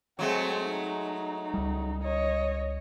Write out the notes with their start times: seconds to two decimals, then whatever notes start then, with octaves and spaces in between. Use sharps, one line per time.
0.19 F#3 G#3 A3 C4
0.65 D#4
1.54 C#2 G3
2.03 C#5 D#5